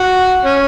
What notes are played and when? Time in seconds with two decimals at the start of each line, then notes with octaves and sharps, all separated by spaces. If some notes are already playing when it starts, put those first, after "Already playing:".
Already playing: F#4
0.45 C#4